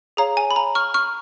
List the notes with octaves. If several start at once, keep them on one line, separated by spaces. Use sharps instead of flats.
G#4 C#5 F5 A#5
G#5
B5
A#5
C#6 F6
C#6 F6